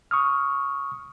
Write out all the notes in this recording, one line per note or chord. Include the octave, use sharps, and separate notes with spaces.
C#6 D#6 F6